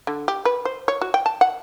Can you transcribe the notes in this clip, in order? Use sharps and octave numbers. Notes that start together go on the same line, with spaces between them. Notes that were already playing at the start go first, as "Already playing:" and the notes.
D3
G4
B4
C5
C#5
F#4
G5
A5
F#5